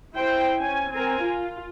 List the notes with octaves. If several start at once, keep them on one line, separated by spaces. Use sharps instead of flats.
E4 C5 G5
C#4 G#5
C4 A#4 G#5
F4